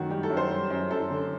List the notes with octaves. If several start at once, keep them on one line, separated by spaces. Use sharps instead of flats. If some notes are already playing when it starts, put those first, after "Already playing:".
Already playing: F#2 D#3 A3 F#4
G3 G4
A4
F#2
C5
G3
F#2
F#2 A4
D3